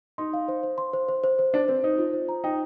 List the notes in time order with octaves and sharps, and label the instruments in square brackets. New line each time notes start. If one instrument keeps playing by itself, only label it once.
[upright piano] D#4 [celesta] C6
[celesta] F5
C5
C5
C6
C5
C5
C5
C5
[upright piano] D4 [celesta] C5
[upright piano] C4 [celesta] C5
[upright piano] D#4 [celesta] C5
[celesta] F4
C5
A#5
[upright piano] D#4 [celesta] G5